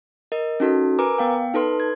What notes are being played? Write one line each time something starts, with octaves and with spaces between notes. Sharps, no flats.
A#4 D#5
C#4 D#4 F#4 A4
A#4 B4 G#5 A#5 D6
B3 F5 G5
D#4 A4 B4 C6
G#6